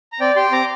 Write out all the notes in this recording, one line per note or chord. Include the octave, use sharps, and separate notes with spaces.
A#5
C4 D5 G5
G4 G5 C6
C4 A#5 D6